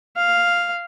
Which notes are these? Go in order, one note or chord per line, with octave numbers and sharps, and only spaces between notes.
F5